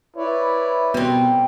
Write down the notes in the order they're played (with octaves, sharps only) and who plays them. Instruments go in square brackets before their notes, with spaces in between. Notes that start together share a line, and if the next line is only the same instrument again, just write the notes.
[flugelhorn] E4 [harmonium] B4 C#5 D5
[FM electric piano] B2 [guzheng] G3 C4 [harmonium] A#3